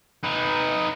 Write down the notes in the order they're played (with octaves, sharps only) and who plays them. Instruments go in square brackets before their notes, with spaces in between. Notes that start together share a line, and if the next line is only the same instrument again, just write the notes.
[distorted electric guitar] D#4 B4